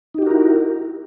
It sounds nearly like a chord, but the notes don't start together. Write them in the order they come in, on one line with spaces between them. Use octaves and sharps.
D#4 G4 F#4 A#4 E4